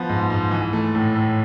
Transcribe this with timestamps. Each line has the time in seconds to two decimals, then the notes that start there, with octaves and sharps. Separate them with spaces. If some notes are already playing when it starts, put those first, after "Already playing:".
Already playing: F3 B3
0.09 G#2
0.30 G#2
0.51 E3
0.73 A3
0.95 A2
1.16 A2